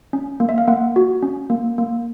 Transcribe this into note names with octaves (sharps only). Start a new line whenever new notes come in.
C#4
A#3
E5
F5
A#3 F#5
F#4
C#4
A#3
A#3